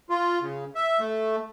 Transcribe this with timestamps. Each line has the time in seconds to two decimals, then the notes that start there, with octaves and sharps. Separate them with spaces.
0.10 F4
0.42 C#3
0.75 E5
1.00 A3